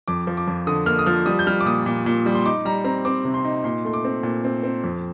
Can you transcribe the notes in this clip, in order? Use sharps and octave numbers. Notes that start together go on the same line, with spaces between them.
F2 D6
F3
D6
F2
D3 D#6
A#3 F6
D#6
F3 F6
G3 D#6
G6
G3 F6
D6
A#2 D#6
A#2
A#2
G3
C6
D#4 D6
G3 A#5
C4 A#5
C4 D6
C3
C6
D#4
A#2 C6
A3 C6
D6
C4
A#2
C4
C4
F2